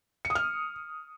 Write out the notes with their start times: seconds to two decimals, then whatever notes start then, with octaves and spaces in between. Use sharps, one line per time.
0.25 C#7
0.30 D#6
0.35 F6